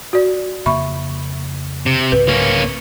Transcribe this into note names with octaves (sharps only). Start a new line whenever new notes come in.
F#4 D5
F2 C#3 A#3 E5 B5 C#6
C3
C2 G#2 C#3 B4
A#3 C#4